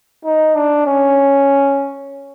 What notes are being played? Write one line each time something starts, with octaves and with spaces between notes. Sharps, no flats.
D#4
D4
C#4